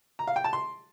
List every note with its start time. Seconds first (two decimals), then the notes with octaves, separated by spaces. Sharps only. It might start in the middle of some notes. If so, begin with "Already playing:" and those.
0.19 A#5
0.27 F5
0.36 G5
0.44 A5
0.53 C6